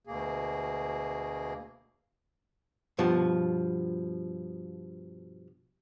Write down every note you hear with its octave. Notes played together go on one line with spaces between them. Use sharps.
D2 B2 A#3 G#4
G2 B2 F3